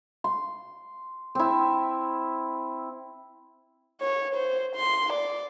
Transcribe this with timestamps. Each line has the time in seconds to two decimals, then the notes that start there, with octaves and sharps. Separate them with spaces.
0.24 C6
1.35 C4 E4
4.01 C#5
4.35 C5
4.76 C6
5.13 D5